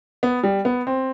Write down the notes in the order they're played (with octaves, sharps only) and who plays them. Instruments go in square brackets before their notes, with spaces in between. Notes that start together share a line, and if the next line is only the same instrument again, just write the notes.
[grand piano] B3
G3
B3
C4